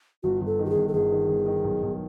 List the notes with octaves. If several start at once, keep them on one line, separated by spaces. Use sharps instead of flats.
G1 F#4
G1 A4
D#3
G4
G#4
G1
A4
G1 G#4
D#3
G1
D#3
B1
B1